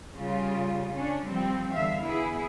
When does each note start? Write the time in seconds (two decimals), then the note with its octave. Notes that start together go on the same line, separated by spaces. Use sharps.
0.17 C#3 G3 F4
0.94 C#4 D4
1.28 F3 G3 C4
1.74 E2 D3 G3 E5 F5
2.04 B3 E4 G#4